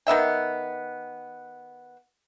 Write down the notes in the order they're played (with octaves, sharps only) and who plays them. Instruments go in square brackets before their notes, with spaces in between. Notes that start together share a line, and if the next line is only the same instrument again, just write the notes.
[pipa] D#3 B3 E5 G5